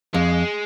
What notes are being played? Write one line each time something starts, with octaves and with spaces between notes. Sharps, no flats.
F2 G#3